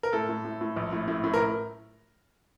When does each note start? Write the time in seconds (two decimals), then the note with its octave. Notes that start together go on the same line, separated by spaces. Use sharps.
0.03 A#4
0.13 A2 A4
0.29 A2
0.45 A2
0.61 A2
0.76 A#1
0.92 A2
1.08 A2
1.24 A2
1.34 A#4